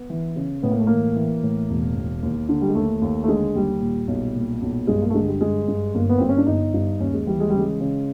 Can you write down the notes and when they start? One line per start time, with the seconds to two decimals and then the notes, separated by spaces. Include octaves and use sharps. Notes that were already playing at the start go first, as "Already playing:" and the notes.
Already playing: B3
0.10 E3
0.36 C#3
0.63 A2 B3
0.71 A#3
0.79 A3
0.87 E3 A#3
1.16 E3
1.43 A2
1.69 E1
1.96 E1
2.22 D#2
2.49 D3
2.61 G3
2.68 G#3
2.75 D#2 A3
3.01 D#2
3.24 A3
3.28 D3 G#3
3.55 D#2 G3
3.81 A#2
4.08 B1
4.35 A#2
4.62 B1
4.87 G2 G#3
5.01 A#3
5.10 A3
5.14 D3 G#3
5.27 G3
5.41 G2 G#3
5.68 G2
5.94 G1 A#3
6.09 B3
6.18 G2 C4
6.29 C#4
6.38 D4
6.47 G1 D#4
6.74 G2
7.00 D#2 C#4
7.14 G#3
7.26 E3 G3
7.40 G#3
7.50 C#3 G3
7.59 G#3
7.80 C#3